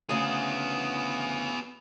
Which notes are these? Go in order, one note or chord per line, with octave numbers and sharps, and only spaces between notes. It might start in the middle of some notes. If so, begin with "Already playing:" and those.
D2 C#3 B3 G#4